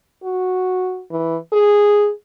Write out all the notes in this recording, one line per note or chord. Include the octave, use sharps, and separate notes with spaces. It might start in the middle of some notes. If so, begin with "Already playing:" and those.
F#4
E3
G#4